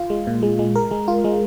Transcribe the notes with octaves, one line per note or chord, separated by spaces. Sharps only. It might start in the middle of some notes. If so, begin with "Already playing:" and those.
Already playing: F4
G#3
A#2
G#3
G#3
A#4
G#3
F4
G#3